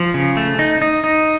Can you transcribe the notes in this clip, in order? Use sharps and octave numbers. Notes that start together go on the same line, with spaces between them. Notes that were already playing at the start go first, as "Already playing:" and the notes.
Already playing: F3
C#3
A3
D#4
D#4
D#4